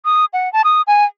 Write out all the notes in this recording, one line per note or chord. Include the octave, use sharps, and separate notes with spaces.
D#6
F#5
A5
D#6
G#5